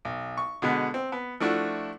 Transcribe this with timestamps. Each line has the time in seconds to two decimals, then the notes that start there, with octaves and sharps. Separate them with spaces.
0.05 B1
0.37 C#6
0.62 B2 D3 G#3 B3
0.94 C4
1.12 B3
1.40 F3 A3 D4 E4 F#4